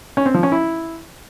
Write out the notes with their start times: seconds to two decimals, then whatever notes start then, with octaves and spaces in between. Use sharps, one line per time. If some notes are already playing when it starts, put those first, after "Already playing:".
0.17 C#4
0.26 C4
0.34 F3
0.43 C#4
0.52 E4